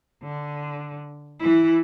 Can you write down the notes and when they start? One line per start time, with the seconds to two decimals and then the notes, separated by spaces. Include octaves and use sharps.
0.23 D3
1.39 E3 E4